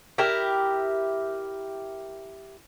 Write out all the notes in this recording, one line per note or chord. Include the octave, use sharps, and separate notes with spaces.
E4 G4 A#4